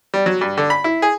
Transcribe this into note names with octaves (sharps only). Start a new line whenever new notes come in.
G3
F#3
G2
D3
B5
E4
G#4